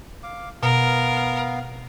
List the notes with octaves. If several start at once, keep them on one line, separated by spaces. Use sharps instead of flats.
F5 D6
B2 B3 A#4 F5